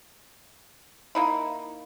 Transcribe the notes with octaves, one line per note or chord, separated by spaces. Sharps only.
A#3 D#4 E4